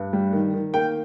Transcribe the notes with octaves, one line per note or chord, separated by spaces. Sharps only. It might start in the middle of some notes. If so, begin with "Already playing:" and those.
Already playing: G2
G3
D#3
D#3
A#3 G5